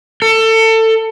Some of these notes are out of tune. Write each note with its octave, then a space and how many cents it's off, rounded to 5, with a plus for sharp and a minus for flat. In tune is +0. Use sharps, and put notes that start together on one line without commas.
A4 +25